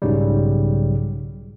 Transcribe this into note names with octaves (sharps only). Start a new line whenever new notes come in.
B1 G#2 C#3 F#3 G3